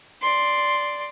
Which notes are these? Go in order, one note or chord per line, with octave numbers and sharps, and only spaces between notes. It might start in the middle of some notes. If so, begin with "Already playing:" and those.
D5 C6